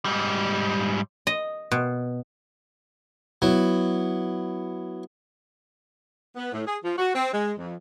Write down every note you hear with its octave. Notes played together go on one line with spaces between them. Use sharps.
G#2 G3
D#5
B2
F#3 B3 E4
B3
A2
G#4
F3
F#4
C4
G#3
F2